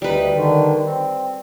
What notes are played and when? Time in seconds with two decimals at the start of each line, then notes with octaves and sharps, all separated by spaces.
0.02 D2 G3 D#4 B4
0.35 D3 D#3
0.85 C4